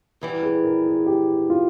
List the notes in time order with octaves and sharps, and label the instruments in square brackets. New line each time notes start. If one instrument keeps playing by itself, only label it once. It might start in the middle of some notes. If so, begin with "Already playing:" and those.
[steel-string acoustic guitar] E2 E3 G3
[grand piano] G#4
A#4
G#4
G4
F4